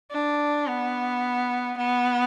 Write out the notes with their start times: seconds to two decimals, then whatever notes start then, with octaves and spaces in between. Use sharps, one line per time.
0.11 D4
0.67 B3
1.78 B3